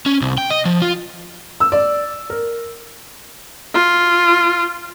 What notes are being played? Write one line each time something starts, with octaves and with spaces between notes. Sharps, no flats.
C#4
C2
G5
D#5
F3
F4
E6
D5
A#4
F4